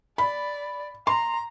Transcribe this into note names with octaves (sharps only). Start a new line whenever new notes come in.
D5 B5
A#5 C6